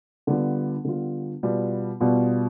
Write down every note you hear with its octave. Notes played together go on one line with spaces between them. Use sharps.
D3 G3 B3 F4
D3 G3 B3 F4
B2 G3 B3 F4
B2 G3 B3 F4